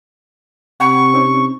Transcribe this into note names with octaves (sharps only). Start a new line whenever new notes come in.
C3 F#5 G5 B5 C#6
C4 C#4 D#4